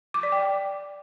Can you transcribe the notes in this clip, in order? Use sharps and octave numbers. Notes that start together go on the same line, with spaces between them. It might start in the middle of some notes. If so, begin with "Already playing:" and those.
D6
D5
G5